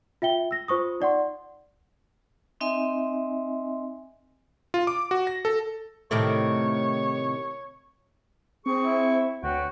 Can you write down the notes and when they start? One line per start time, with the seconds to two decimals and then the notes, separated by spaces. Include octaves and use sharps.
0.22 F4 E5 G5 G7
0.51 E6 A#6
0.68 F4 C5 C#6 D#6
1.00 D#4 D5 F#5 C6
2.61 C4 D#4 D#5 E5 G#5 C6
4.74 F4
4.87 D6
5.11 F#4
5.27 A#6
5.45 A4
6.11 A2 C3 D#3 A3 C#5
8.66 C4 G#4 C#6
8.84 E4
9.43 D2 F#4 B4 C#5 G5